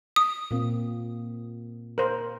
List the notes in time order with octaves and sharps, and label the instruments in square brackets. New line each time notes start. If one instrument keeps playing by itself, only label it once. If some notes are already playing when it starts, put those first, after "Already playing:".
[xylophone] D#6
[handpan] A#2 A#3 C4
[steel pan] A#4 C5